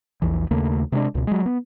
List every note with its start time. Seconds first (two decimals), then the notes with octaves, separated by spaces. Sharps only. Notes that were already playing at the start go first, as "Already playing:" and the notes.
0.22 A#1 E2 E3
0.51 D#2 C#3 A3 A#3
0.92 C3 G#3 C#4 D4
1.15 C#2 B2
1.27 F#3 G#3
1.46 B3